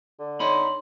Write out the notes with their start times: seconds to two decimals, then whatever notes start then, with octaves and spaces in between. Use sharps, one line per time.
0.19 D3
0.40 D#4 C#5 D#5 B5 C6